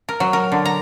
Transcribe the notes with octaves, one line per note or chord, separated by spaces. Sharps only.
A#4
F#3
A#4
D3
A#5